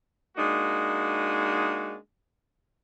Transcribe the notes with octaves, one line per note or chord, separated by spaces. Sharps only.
G#3 A#3 D4 D#4 F#4